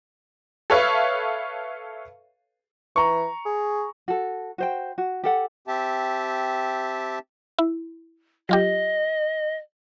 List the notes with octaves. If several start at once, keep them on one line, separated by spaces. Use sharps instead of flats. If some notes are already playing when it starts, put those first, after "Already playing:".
A4 B4 C#5 E5 F5
E3 A#5 C#6
G#4
F#4 A4
F#4 C5 G5
F#4
G4 A4 F#5
C4 G4 E5 A5
E4
F#3 F4 G4 D#5